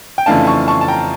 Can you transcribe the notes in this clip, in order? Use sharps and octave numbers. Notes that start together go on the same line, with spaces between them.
G5
F2 C#3 E3 A3 D4 F5 A5
A5 C#6
A5 C#6
A5
G5 A#5